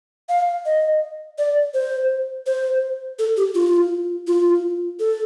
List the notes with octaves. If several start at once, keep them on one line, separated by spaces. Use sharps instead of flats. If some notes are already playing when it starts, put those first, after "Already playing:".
F5
D#5
D5
C5
C5
A4
G4
F4
F4
A4